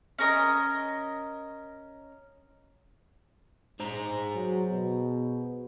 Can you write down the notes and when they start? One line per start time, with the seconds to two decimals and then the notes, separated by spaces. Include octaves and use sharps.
0.18 C#4 A#4 D#5
3.80 G#2 G#4 C5 A#5
4.34 F#3
4.70 B2